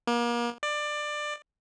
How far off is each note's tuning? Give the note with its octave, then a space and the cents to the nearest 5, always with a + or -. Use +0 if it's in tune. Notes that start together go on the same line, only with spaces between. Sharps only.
A#3 +35
D5 +20